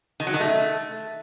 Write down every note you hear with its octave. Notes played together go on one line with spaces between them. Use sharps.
D#3
F#3
D#3
A3